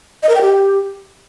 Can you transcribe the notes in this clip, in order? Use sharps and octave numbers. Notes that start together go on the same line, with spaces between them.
D#5
A#4
G5
G4